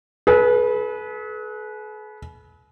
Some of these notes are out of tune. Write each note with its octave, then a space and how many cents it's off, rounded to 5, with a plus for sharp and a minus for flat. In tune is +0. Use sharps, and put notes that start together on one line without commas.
G#4 +45 B4 -15